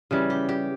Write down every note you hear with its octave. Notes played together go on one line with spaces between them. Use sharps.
C#3 E3 G3
G4
G4